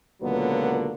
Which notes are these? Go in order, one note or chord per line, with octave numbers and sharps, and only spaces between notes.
C#2 A#2 D3 F#3 A#3 B3